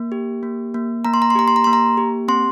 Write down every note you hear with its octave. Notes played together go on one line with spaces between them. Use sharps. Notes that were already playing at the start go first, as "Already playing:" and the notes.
Already playing: A#3
G4
A#3
A#3
A#3 A#5
C6
A#5
C6
G4 A#5
C6
A#5
A#3 C6
A#5
G4
C4 C6